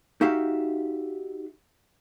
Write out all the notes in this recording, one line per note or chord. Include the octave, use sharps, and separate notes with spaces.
D#4 F#4 G4 E5 F5